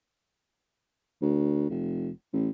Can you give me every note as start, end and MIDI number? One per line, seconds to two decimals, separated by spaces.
1.22 1.69 38
1.70 2.10 29
2.33 2.49 33